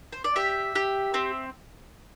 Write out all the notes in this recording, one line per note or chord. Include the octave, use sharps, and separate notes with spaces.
C5
D5
G4 E5
G4
C4